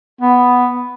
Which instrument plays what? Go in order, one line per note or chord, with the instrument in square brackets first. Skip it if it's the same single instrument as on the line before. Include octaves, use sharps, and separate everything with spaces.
[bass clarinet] B3